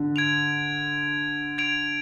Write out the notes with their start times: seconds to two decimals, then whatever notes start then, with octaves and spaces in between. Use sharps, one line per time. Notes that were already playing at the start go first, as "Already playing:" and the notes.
Already playing: D3
0.16 G#6 D7 F7
1.58 G#6 D7 F7